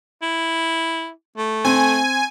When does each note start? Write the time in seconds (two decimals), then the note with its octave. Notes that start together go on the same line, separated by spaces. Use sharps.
0.22 E4
1.37 A3
1.65 C4 G#5